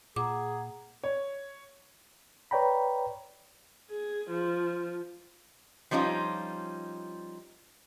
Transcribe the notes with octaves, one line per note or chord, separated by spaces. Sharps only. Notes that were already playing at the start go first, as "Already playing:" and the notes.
A#2 G#4 F#5 A#5 D6
C#5
B4 C#5 D5 G5 A#5 B5
G#4
F3
F3 G3 C#4 D#4 F4